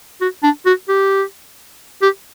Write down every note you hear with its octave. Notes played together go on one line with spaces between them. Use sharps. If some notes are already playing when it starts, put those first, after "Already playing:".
F#4
D4
F#4
G4
G4